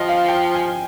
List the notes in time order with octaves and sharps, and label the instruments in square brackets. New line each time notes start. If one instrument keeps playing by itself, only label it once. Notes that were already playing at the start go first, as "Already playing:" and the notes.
Already playing: [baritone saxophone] F3 [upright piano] D#5 G5
[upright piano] F5
G5
G#5